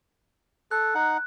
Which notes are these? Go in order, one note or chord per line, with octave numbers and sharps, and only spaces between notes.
A4 F#6
D#4 F#5